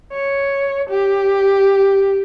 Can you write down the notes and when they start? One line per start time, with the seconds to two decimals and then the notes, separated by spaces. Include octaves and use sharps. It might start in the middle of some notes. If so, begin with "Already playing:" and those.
0.13 C#5
0.89 G4